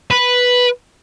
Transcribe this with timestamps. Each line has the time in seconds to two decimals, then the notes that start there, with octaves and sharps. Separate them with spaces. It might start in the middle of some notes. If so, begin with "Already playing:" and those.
0.11 B4